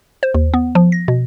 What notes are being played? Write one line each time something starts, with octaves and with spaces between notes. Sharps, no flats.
C5
D#2
B3
F3
A#6
B2